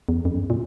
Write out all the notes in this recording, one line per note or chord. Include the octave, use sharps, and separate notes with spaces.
E2
F2
F#2
A#2